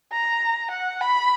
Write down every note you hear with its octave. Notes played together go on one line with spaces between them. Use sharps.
A#5
F#5
B5